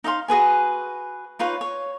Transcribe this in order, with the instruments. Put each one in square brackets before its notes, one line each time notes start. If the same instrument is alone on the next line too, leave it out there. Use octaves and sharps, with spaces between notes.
[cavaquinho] D#4 D#5 F5 C6
F#4 G#4 B4 G#5
D#4 F4 B4 C#5
C#5